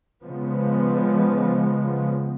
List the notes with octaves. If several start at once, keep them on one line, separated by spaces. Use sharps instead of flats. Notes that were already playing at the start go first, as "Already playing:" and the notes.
C#3 F3 G#3 B3